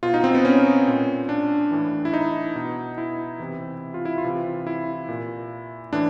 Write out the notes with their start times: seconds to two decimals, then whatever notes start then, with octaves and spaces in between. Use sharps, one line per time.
0.03 B2 F4
0.14 D#4
0.24 C4
0.34 B3
0.45 C#4
0.88 A#2
1.29 D4
1.71 A2 E3
2.05 E4
2.13 D#4
2.56 B2
2.98 E4
3.40 C3 E3
3.94 F4
4.05 E4
4.18 F4
4.24 C3 E3
4.67 E4
5.09 A#2
5.93 A2 E3 D4